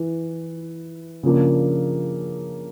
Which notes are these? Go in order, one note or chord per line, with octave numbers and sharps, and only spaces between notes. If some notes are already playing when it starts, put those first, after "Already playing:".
Already playing: E3
C#3 F3 A#3 D4